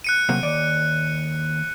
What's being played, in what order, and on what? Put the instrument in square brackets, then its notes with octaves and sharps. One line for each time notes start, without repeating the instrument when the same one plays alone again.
[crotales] F#6 C#7 D#7
[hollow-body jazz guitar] C3 F#3 A#3
D#2 D5